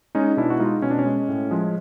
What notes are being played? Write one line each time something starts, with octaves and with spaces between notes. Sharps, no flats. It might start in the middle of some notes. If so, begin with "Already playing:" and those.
G#3 C#4 D#4
B2 D4 E4
F#4
G#3 D#4 F4
B2 C#4
D4
C#4
G#3
A2
F3 G#3